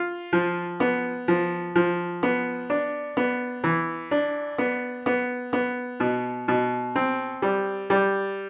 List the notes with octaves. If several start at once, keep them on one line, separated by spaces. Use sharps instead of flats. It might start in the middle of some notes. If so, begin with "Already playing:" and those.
Already playing: F4
F3
B3
F3
F3
B3
D4
B3
E3
D4
B3
B3
B3
B2
B2
C4
G3
G3